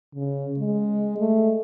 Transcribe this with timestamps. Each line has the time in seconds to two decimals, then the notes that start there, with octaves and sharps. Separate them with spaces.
0.15 C#3
0.59 G#3
1.19 A3